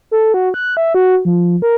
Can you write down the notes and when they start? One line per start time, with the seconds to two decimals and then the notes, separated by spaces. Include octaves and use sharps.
0.11 A4
0.34 F#4
0.54 F#6
0.77 E5
0.95 F#4
1.25 F3
1.62 A#4